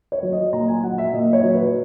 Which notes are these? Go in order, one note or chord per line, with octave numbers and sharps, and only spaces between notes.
C#5
F#3
D#5
A#2 A#5
G#5
F#3 F#5
E5
A#2 D#5
C#5
F#3
B4